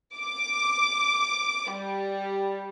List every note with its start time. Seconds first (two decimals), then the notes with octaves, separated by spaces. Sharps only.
0.17 D6
1.72 G3